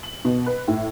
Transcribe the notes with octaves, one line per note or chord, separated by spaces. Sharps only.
F#7
B2
B4
A2